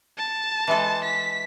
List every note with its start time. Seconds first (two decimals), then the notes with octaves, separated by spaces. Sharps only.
0.18 A5
0.67 E3 G#3 A4
1.04 B6